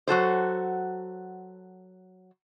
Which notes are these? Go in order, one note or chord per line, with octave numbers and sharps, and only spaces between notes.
F#3 F#4 A4 C5